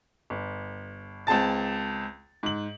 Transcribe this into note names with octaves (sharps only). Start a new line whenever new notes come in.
G1
C#2 C4 G#4 A5 A6
G#2 F#7